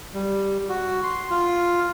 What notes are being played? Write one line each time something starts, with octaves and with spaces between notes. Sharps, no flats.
G3
F#4
C6
F4